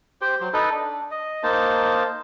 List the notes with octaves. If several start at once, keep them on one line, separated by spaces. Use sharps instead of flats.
G4 C5 G5
F#3 C5
D#4 A4 B4
D4
D#5
A#3 D#4 C5 A5